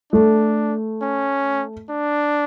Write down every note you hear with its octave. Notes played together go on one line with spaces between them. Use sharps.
A3 D4
C#4
D4